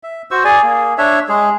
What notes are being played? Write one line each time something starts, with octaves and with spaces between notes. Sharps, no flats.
E5
F#4 C5 C#6 E6
G#4 D5 G#5
A#3 G#4
D4 C#5 E5
G#3 G#4